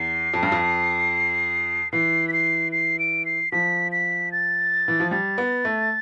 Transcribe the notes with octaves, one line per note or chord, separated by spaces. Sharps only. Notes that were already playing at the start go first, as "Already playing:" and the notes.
Already playing: E2 C7
F2
G2
F2
E3 C7
B6
C7
C7
D7
C7
F3 B6
B6
A6
E3
F3
G3 A6
B3
A3